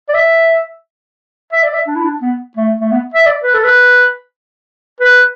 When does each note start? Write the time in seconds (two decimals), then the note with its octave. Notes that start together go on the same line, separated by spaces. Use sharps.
0.09 D5
0.14 E5
1.52 E5
1.63 D5
1.74 E5
1.87 D4
1.96 E4
2.04 D4
2.22 B3
2.57 A3
2.81 A3
2.92 B3
3.14 E5
3.26 D5
3.43 B4
3.54 A4
3.64 B4
5.00 B4